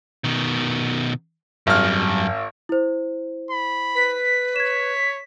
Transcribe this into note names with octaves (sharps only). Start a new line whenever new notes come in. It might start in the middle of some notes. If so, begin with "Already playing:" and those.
B2 D#3
G#1 F#2 G3 F6
E4 C5
B5
B4 B6
C#5 G#6 E7